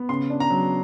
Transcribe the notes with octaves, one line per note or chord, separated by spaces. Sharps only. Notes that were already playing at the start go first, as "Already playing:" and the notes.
Already playing: B3
C#3 C6
D4
A#5
F#3